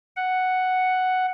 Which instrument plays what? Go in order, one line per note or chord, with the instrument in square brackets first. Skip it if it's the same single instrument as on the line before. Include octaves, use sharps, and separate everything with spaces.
[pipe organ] F#5